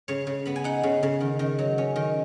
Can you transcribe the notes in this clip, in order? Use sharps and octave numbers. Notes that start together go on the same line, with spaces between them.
C#3 C#5
C#3
B3 B5
G#5
D#4 F#5
C#3
C#3
D#3
D#3
F#3
C#4
D#3